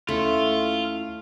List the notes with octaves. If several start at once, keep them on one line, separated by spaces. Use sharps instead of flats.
D#2 A3 C#4 E4 F4